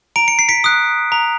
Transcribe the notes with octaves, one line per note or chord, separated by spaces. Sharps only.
A#5 D7
C#7
C7
B6 C#7
D#6 F#6
A#5